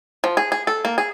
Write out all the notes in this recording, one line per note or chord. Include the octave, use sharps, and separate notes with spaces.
F3
G#4
G#4
A4
A#3
G#4